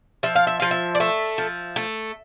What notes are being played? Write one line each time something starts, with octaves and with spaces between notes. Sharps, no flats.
F3 E5
F5
E5
F3 F5
E5
D5
A3 E5
F3
A3